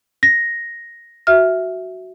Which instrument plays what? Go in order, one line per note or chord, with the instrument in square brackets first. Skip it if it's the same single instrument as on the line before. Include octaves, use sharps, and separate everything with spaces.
[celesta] A#6
[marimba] F#4 E5 F6